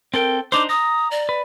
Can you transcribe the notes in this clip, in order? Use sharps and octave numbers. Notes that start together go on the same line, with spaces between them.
C4 A4 A#4 G5
D4 D#4 C5 D6
A#5 D#6
D5
B4